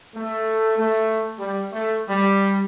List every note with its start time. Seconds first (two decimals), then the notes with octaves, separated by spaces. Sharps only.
0.15 A3
0.78 A3
1.38 G3
1.72 A3
2.09 G3